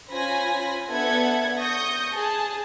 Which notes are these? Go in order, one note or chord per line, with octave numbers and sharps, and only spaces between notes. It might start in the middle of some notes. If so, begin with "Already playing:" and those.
C#4 F4 C5 G#5 B5 A#6
B3 D4 A4 E5 F#5 G#6
C#6 D#6 G6 A#6
G#4 A5